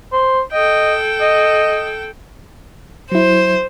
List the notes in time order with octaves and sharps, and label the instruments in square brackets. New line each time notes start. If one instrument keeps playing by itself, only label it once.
[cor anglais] C5
[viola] A4 G5 [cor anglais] D#5
[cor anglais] D#5
[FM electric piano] F#3 E4 [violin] C5